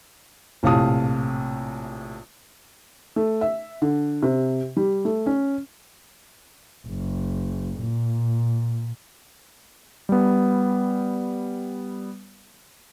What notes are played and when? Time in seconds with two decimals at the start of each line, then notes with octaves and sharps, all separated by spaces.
0.63 A#1 A2 C3 F5 A5 D#6
3.16 A3
3.41 E5
3.82 D3
4.23 C3
4.77 G3
5.05 A3
5.26 C#4
6.88 F#1
7.79 A#2
10.09 G3 B3